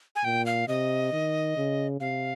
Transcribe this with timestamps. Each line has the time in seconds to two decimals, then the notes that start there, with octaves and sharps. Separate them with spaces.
0.16 G#5
0.24 A#2 G5
0.46 F5
0.68 C3 D#5
1.13 D#3
1.57 C#3
2.00 C3 F5